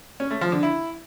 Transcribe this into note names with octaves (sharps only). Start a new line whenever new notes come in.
C#4
A3
F3
D3
E4